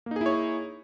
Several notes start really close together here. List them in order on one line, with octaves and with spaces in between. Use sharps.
A#3 D#4 G#4 E4 C#5